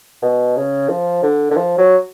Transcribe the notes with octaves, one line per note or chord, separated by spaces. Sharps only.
B2
C#3
F3
D3
D3
F3
F#3